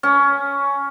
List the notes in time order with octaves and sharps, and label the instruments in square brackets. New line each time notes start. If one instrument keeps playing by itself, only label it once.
[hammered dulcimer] C#4